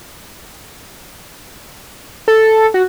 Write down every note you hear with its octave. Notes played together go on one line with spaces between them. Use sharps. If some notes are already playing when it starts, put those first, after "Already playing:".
A4
F#4